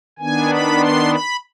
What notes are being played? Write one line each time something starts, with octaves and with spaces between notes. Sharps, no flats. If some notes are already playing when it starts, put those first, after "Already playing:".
D#3 B3 D4 G#5
B5
C6
B5